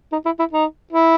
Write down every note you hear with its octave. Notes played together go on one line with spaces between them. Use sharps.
D#4
E4
E4
D#4
E4